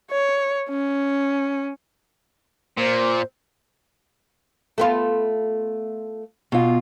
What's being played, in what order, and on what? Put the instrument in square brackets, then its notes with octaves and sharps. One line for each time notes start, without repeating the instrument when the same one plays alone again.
[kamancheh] C#5
C#4
[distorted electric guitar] A#2 [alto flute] C5
[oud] A3 B3 F4
[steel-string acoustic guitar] B2 F4